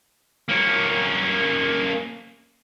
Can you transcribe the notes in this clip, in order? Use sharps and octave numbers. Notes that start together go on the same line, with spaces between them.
A#3 C#4